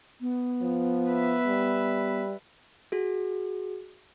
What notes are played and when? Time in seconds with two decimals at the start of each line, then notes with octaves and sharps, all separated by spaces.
0.21 B3
0.61 F3
1.08 B4 E5
1.47 G3
2.92 F#4 G#4